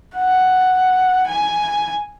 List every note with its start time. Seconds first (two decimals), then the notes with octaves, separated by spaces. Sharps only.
0.15 F#5
1.27 G#5